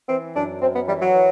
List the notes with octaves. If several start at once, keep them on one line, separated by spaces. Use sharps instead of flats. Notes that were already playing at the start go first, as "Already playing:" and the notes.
E3 C4
F#2 D4
F#2 C4
B3
E3 G3
F#3
E3